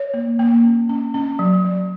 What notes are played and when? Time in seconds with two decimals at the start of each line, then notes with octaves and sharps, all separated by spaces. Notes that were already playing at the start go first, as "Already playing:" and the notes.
Already playing: C#5
0.14 A#3
0.39 A#3
0.64 C#4
0.89 C#4
1.14 C#4
1.39 F#3
1.64 F#3